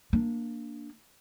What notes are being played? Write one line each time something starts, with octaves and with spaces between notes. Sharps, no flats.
A#3 D4